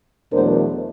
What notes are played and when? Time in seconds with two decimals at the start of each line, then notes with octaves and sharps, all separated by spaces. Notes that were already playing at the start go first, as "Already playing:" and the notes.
0.32 E2 B2 F#3 A3 D4 A#4 C5